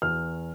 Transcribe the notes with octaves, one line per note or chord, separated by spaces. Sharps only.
E2 F6